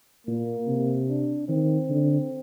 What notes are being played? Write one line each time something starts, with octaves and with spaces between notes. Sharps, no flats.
A#2 A#3
C3
D4
D#3 C4
D3